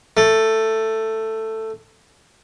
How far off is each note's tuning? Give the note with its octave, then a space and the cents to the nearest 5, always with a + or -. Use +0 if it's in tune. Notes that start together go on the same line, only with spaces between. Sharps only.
A3 +10